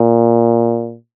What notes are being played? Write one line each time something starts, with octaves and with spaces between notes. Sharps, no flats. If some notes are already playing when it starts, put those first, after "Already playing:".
Already playing: A#2